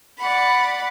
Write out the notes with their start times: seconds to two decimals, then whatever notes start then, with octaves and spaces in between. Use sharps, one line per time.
0.18 D5 F#5 B5